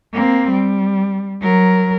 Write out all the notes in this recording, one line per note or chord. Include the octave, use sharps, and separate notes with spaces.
A#3 C4
G3
F#3 A#4